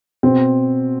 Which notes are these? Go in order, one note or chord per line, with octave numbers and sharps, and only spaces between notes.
B2 C4